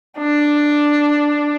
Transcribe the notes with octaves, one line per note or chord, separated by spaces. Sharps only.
D4